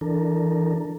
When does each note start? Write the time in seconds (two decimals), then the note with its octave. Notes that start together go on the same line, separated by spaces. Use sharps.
0.01 E3 D4 A4 A#4